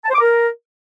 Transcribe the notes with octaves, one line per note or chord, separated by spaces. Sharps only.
A5
C5
D6
A#4